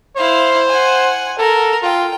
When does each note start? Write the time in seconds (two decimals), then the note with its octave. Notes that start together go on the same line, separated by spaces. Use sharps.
0.16 E4 C5 F5
0.69 F#5 G#5
1.38 A4 A#4
1.82 F4 G5